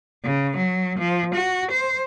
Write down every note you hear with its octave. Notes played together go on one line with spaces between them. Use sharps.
C#3
F#3
F3
F#4
C5